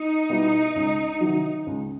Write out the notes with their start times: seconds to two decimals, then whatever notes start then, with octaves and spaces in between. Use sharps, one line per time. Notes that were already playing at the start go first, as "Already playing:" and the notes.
Already playing: D#4
0.30 B2 G3 B3 E4
0.75 C#2
1.21 C3 D#3 F#3
1.67 C#2